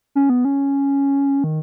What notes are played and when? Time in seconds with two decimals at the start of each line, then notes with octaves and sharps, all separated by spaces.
0.15 C#4
0.29 B3
0.45 C#4
1.44 D#3